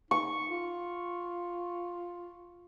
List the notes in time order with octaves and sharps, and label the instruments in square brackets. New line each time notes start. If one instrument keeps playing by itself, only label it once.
[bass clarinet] D#4 [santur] C#6
[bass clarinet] F4